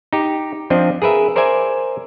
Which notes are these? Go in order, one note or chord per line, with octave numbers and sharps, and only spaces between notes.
D#4 G4
F3 C4 D4 D#5
G#4 A#4 B4 E5
A#4 C5 D5 E5 G#5